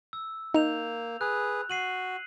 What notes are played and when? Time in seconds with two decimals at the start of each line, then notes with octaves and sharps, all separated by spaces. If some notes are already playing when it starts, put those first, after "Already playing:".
0.13 E6
0.54 A#3 D#4 G6 F7
1.21 G#4 B4 F#6
1.70 F#4 C7 D#7 F#7